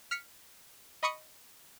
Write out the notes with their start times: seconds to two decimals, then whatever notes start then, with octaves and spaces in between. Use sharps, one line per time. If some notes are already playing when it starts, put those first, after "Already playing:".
0.11 F6 B6 C#7
1.03 D#5 B5 C#6 D#6 C#7 D#7